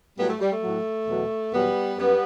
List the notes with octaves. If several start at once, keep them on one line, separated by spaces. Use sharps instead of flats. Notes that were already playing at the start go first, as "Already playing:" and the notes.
A2 F#3 G3 B3
A3
G3
A3
A2 F#3
E2 B2 F#3
E2 B2 F#3 G3 B3
F#2 F#3 G3 B3